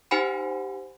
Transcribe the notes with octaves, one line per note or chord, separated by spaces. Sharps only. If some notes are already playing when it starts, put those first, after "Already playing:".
D#4 G4 C5 F#5 G#5 B5